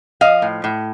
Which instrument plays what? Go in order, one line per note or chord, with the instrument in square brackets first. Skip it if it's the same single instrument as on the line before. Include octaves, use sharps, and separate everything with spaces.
[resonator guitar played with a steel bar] F3 D#5 F5
A2
A2